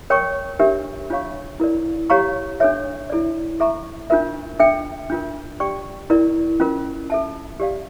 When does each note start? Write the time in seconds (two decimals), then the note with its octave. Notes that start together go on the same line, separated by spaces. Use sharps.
0.10 A#4 C#5 G5 C#6
0.59 D4 G4 A#4 E5
1.10 D4 F4 C#5 F5 C#6
1.60 E4 A#4 D5
2.10 G4 C#5 F5 A#5 C#6
2.60 D4 A4 C#5 E5
3.10 E4 A4 D5
3.60 A4 E5 A#5 C#6
4.10 D4 F4 A#4 E5
4.59 D4 A4 E5 G5
5.10 D4 F4 A#4
5.60 G4 D5 G5 C#6
6.10 E4 A#4 D5
6.60 C#4 F4 A#4
7.10 A4 E5 A5
7.60 G4 D5 F5